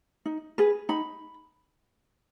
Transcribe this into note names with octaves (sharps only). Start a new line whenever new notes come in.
D#4
G#4 B4
D#4 B5